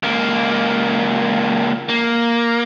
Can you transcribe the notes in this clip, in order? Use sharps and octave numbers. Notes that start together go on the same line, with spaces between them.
C#2 A#3
A#3